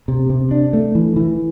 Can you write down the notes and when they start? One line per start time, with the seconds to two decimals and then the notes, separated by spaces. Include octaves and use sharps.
0.08 C3
0.30 C3
0.51 D4
0.73 A3
0.95 E3
1.16 E3